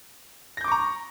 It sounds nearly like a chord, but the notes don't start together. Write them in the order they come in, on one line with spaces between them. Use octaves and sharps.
A#6 G6 D6 C#6 A#5